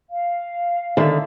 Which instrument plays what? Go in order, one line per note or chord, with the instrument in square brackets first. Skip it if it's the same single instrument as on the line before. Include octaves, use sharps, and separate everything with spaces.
[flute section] F5
[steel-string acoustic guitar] D3 [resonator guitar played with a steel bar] D#3 E5